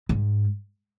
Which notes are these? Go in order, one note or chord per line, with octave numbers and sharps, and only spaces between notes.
G#2